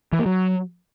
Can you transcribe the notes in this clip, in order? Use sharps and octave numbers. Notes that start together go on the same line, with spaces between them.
E3
A#3
F#3